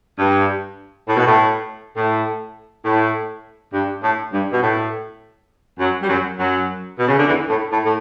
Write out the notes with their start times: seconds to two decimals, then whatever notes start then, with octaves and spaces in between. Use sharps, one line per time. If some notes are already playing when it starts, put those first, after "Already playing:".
0.19 G2
1.08 A2
1.16 B2
1.26 A2
1.96 A2
2.84 A2
3.73 G2
4.02 A2
4.32 G2
4.52 B2
4.61 A2
5.79 F#2 F#3
6.02 G3
6.08 F#2 F#3
6.38 F#2 F#3
6.99 B2
7.07 C#3
7.17 D3
7.27 E2 E3
7.49 A2
7.71 A2
7.84 A2